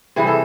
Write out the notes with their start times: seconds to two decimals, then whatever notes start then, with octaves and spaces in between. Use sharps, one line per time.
0.16 C3 E3 G3 G#4
0.27 A4